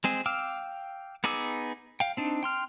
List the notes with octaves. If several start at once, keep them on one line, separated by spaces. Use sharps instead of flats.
G#3 C4 G#4
F5 G5 D6 E6 F6
B3 D#4 G#4 D6 E6
F5 G5
C4 D4 D#4
G5 C6 F6